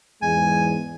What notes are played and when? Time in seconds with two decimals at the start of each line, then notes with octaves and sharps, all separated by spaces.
0.22 E2 G#2 G#3 G#5